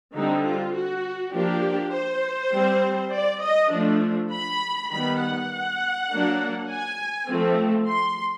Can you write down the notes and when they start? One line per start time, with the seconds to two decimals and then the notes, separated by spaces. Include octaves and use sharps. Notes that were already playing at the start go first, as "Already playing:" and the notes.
0.14 D3 G3 C4 D#4
0.44 F4
0.74 F#4
1.33 F3 A#3 D4 G4
1.92 C5
2.52 G3 C4
3.12 D5
3.42 D#5
3.71 F3 A3 D4
4.31 B5
4.91 D#3 G3 B3 B5
5.20 F#5
6.09 F#3 A#3 D4
6.70 G#5
7.28 F3 A3 C4
7.88 C6